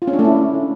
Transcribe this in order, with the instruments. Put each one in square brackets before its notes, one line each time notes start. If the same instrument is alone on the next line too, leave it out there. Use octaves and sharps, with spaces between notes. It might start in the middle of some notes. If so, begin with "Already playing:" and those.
[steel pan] F4
C#4
D4
A3
E4